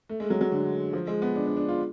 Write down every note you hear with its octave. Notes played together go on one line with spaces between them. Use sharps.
A3
G#3
F#3
F#3
D3
F3
G#3
B3
D4
D4
D4
F4